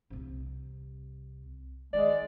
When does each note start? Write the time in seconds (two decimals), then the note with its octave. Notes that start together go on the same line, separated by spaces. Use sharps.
0.10 C2 C3
1.93 D#3 G#3 D5